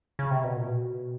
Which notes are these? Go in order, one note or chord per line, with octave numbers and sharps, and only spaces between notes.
C#3
C3
B2
A#2
B2